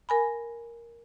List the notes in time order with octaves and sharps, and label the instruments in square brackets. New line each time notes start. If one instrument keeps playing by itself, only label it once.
[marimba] A#4 G#5 B5